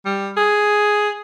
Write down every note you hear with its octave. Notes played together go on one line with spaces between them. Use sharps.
G3
G#4